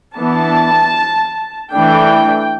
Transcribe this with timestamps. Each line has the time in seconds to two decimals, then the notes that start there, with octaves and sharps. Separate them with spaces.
0.16 E3 B3 D4 A5
1.73 E3 A3 D4 G5